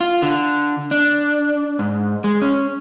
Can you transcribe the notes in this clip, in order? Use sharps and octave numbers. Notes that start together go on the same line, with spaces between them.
F4
D3
D4
G#2
G#3
C#4